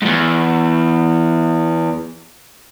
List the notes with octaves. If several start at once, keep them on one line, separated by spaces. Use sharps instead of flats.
E2 G#2